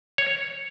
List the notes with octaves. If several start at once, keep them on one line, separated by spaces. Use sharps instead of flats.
C#5